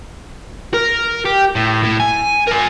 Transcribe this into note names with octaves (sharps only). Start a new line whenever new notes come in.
A#4
G4
A2
A2
G#5
A#4 G#5